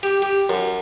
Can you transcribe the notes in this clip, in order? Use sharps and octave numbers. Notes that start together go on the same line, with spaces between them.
G4
G4
F#2